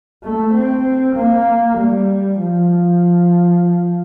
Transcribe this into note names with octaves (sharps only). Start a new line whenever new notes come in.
A3
C4
A#3
G3
F3